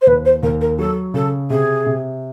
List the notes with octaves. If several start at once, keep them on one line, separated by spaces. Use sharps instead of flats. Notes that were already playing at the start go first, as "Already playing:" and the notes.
C5
D#2 B4
C5
D#2 A#4
A#4
F#3 A4
C#3 A4
C3 G#4
C3